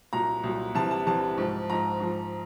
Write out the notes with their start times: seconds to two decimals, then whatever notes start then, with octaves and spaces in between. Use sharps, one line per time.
0.13 C2 A#2 F#3 A#5
0.43 C2 A#2 F#3
0.75 C2 C3 E3 G3 A5
0.91 A5
1.06 C2 C3 E3 G3 A5
1.37 G#2 F3
1.69 G#2 F3 A#5
2.00 G#2 F3